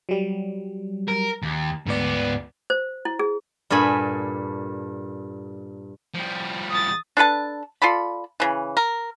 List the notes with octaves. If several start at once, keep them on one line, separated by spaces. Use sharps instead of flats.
F#3 G3
A#4
D#2
D2 G#2 B3 D5
C5
E4
G#4
G2 A#2 A4 G#5 B5
F3 G3
D#6 A6
D4 A4 B4 A5
F4 A4 D5 B5
C#3 E3
A#4